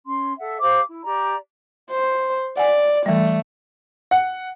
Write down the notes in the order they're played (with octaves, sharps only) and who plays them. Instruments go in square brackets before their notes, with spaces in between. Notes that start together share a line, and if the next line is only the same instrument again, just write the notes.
[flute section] C#4 C6
A4 E5 F#5
G4 C5 F5 D6
E4
G4 D5 A#5
[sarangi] C5
[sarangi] D5 [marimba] F#5 G#5
[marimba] E3 G3 [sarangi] A3
[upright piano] F#5